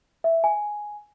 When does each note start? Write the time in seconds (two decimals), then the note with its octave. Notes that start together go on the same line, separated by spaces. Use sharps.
0.24 E5
0.44 G#5